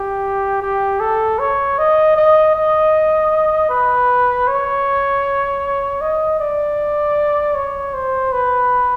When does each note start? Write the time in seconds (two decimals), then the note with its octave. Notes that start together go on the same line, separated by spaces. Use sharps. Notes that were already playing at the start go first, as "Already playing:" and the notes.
Already playing: G4
0.62 G4
1.00 A4
1.39 C#5
1.78 D#5
2.16 D#5
2.55 D#5
3.70 B4
4.48 C#5
6.01 D#5
6.40 D5
7.55 C#5
7.94 C5
8.32 B4